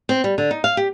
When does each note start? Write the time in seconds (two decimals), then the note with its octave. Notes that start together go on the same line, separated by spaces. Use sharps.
0.09 C4
0.24 G3
0.38 D3
0.51 D#4
0.64 F5
0.77 G4